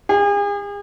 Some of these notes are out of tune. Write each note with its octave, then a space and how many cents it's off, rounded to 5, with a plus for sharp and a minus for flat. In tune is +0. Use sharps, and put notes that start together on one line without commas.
G#4 -40